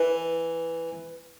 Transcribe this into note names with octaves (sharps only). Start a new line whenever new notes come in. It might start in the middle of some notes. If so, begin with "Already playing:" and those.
Already playing: E3